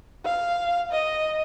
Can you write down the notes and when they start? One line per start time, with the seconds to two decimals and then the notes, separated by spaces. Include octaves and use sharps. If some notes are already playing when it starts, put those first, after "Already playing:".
0.24 F5
0.91 D#5